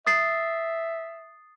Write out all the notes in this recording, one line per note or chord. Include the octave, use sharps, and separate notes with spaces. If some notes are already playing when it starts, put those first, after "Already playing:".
E5 D#6 A6 C7